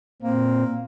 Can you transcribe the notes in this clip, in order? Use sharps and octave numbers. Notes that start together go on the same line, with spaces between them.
A#2 A#3 C4